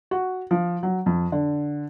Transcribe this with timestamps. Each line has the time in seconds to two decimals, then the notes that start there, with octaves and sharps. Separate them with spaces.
0.11 F#4
0.51 F3
0.83 F#3
1.06 F2
1.32 D3